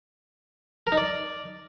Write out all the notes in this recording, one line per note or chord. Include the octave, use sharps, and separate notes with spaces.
A#4
D#4
D5